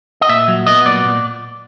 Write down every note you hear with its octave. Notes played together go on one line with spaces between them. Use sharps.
D#5
A#2 E5
F#3
B3 D#5
A#2 D5
A#2